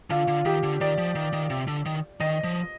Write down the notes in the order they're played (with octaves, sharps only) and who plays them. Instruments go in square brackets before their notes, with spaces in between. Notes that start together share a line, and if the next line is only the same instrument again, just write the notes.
[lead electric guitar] D3 [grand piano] F4
[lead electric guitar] D3
[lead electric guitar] D#3 [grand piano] G4
[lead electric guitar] D3
[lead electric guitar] D#3 [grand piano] D5
[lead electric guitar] F3
D#3
D#3
C3
D3
D#3
[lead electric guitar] D#3 [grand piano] D#5
[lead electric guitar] F3